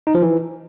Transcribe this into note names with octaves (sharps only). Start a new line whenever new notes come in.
D#4
F3
E3